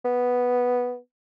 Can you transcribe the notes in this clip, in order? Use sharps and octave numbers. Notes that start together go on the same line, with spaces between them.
B3